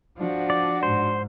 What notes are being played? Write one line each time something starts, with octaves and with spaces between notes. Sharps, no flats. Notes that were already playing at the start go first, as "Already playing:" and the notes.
F3 D4 F#4
D5
G#2 C5